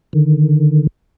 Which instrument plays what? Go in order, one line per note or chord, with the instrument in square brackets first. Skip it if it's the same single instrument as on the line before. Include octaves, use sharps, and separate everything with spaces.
[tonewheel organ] D3 D#3